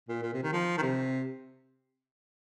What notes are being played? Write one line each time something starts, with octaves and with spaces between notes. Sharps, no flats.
A#2
A#2
C3
D#3
F3
D#3
C3